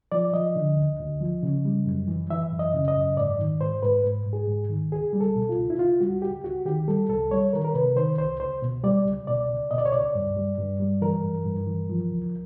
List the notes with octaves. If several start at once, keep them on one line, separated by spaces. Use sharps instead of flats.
F3 D5
F3 D#5
D3
D2
D2
F3
C#3
G3
F#2
E3
E3 E5
F#2
D#5
C#3
D#5
F#2
G#2 D5
D#3
G#2 C5
G#2 B4
G#2
G#2
G#4
G#2
D#3
C#2 G#4
G3
A4
B2
F4
C#2
E4
C#2 F4
G3 F#4
C#2 G4
C#2 F#4
D#3 G4
G3 A4
C2 A4
G3 C#5
D#3 A#4
A#4
C3 B4
D#3 C5
C2 C5
C#2 C5
B2
G3 D5
C#2
B2 D5
C#2
B2 D#5
D5
C#5
C#2 D5
G2
G3
G2
G3
E3 A#4
G2
G2
E3
F3
C#2